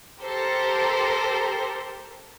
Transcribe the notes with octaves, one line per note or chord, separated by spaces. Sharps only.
G4 A4 A#4 C5